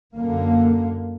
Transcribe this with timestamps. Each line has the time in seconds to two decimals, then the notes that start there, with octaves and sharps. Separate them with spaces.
0.15 F#2 D3 A#3